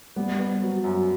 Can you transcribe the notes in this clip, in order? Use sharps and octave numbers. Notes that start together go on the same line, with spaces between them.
G3 B3
B3
F#3
F#2